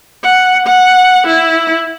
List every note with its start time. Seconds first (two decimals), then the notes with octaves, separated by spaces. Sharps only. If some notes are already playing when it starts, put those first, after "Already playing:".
0.23 F#5
0.66 F#5
1.27 E4